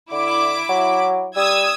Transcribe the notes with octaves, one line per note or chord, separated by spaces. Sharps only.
D3 E4 D6
F#3
G3 D#6 E6 G#6